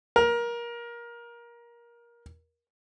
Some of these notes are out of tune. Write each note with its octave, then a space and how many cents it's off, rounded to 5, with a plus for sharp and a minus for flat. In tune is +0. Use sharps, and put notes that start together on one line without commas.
A#4 +20